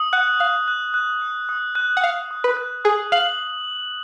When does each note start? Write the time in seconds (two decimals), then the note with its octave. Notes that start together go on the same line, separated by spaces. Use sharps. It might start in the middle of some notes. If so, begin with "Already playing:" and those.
Already playing: D#6
0.13 F#5 F#6
0.40 F5 F#6
0.68 F#6
0.94 F#6
1.22 D#6
1.49 D#6
1.75 F#6
1.97 F#5
2.03 F5 F#6
2.31 D#6
2.44 B4
2.57 F#6
2.84 G#4 D#6
3.12 F5 F#7